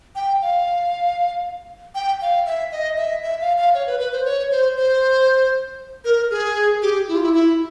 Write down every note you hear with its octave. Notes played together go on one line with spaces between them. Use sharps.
G5
F5
G5
F5
E5
D#5
E5
E5
F5
F5
C#5
B4
B4
C5
C#5
C5
C5
A#4
G#4
G4
E4
F4
E4
E4